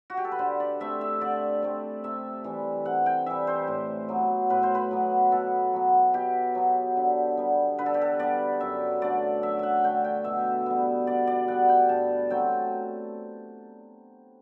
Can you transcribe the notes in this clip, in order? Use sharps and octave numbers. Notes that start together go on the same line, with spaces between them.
F#4
G4
A4
B4
D3 C5
D5
A3 C4 E5
E5
D3 D5
A3 C4
C3 E5
E3 G3
C3 F#5
G5
E3 G3 E5
C5
A2
F#3 B3
A2 B4
C5
B4
F#3 B3
B2 A4
F#3 B3
B2 G4
F#3 B3
D3
G3 B3
D3 B4
A4
G4
A4
G3 B3 D5
F#2 E5
D3 A3 D5
F#2 E5
E5 F#5
D3 A3 G5
G5
B2 E5
G3 B3
B2 D5
D5
G3 B3 F#5
G5
G2 A5
F#3 A3 C4 G5